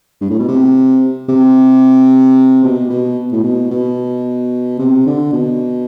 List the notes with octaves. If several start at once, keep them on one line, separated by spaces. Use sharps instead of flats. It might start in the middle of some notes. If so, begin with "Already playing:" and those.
G2
A2
B2
C3
C3
B2
B2
A2
B2
B2
C3
D3
B2